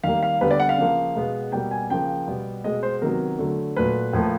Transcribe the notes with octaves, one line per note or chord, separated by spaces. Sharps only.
D#3 G3 A#3 F5
F5
D3 G3 B3 B4
D5
F#5
F5
C#3 F3 A#3
B2 G#3 B3
B2 G3 A#3 G5
G#5
C#3 F3 A#3 G5
B2 G3 B3
B2 G#3 B3 D#5
C5
C3 D#3 F#3 B3 A#4
D3 F#3 A3
A#2 F#3 A3 B4
A2 F3 A#3